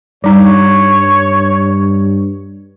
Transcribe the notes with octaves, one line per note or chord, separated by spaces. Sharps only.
G2 G3 D#4 C#5